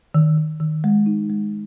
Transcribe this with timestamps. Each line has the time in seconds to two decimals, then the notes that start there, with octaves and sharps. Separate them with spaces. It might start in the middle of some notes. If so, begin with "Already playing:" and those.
0.14 D#3
0.38 D#3
0.60 D#3
0.84 G#3
1.06 D#4
1.30 G#3